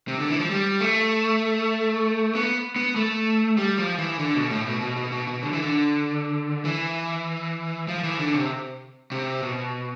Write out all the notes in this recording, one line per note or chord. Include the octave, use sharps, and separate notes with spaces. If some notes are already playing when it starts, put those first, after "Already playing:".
C3
D3
E3
F3
G3
A3
B3
B3
A3
G3
F3
E3
D3
B2
A2
B2
B2
B2
B2
B2
D3
E3
D3
E3
F3
E3
D3
C3
C3
B2